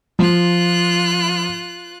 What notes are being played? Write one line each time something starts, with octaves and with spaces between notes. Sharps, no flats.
F3 F4 F#6